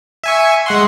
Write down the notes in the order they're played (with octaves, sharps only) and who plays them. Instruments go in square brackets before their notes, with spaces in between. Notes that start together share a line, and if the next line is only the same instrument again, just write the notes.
[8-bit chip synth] E5 G#5 C#6
G#3 F#5 C6